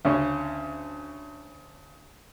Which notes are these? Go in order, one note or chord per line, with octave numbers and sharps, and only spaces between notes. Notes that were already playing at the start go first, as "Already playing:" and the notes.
D2 C#3 C#4